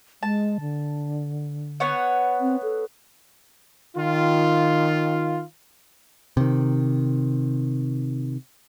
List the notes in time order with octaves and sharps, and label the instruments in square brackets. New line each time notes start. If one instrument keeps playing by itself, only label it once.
[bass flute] G#3 [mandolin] A5
[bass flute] D3
[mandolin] B3 C#5 F#5
[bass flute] C4
A4
[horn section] D#3 F4
[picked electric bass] C3 D#3